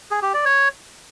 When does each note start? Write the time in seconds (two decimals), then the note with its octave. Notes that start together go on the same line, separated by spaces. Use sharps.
0.11 G#4
0.22 G4
0.34 D5
0.45 C#5